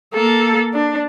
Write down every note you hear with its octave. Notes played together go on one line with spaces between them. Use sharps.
A#3 A4
D4